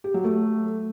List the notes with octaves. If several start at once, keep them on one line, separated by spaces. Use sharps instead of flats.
G4
F#3
A3